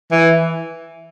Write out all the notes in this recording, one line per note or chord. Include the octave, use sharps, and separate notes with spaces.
E3